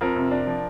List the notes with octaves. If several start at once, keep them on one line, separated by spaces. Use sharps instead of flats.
F2 A#4
C3
D4
F3